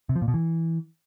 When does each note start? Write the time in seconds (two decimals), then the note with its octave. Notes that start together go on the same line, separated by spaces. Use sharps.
0.09 C3
0.15 F3
0.22 A#2
0.28 B2
0.34 E3